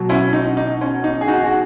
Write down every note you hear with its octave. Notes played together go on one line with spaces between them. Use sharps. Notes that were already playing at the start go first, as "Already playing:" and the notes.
Already playing: B2 F#3
C#4 E4
D#4
D#4
C#4
D#4
G#4
D#4 F#4
G#4
F#4